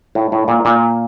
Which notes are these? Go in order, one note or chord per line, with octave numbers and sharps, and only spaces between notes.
A2
A2
A#2
A#2